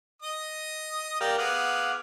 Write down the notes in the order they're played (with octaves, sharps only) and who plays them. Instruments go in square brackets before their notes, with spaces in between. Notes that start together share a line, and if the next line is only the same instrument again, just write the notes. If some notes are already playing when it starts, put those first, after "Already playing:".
[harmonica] D#5 D#6
[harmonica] G4 D5 [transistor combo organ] A#4 F5 G5
[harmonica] B3 G#4 [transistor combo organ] F5 F#5 D6